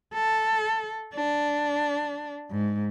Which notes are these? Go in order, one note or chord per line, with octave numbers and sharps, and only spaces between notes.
A4
D4
G#2